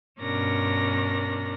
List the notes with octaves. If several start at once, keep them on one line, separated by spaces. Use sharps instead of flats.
G2 B2 C#4 D4 A#4 A#6